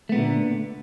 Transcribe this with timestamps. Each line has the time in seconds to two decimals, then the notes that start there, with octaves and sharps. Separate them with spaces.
0.09 A3
0.12 B3
0.15 A#2
0.18 D3